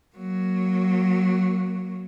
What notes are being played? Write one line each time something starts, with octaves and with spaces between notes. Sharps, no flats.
F#3 A#3